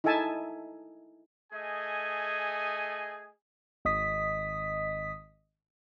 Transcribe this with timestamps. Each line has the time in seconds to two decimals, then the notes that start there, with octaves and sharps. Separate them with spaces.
0.04 D#4 E4 A4 E5 G#5 A5
1.53 A3 G#4 D#5 G#5
3.85 G#1 D#5 D#6 B6